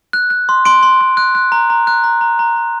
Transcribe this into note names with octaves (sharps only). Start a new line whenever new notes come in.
F#6
F#6
C6
C6 D7
C6
C6
F#6
F#6
A#5
A#5
F#6
A#5
A#5
A#5
A#5